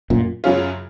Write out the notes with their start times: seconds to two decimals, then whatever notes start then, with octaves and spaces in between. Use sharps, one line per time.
0.10 F#2 A#2
0.44 F#2 C#3 F#3 C#4 F4